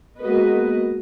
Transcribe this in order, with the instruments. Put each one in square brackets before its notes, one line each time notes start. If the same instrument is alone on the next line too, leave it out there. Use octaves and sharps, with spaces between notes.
[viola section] G#3 A#3 B3 F#4 B4 D#5